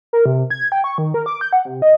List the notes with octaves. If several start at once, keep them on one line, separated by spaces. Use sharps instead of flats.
A#4
C3
G#6
G5
C#6
D#3
A#4
D6
G6
F#5
C3
D#5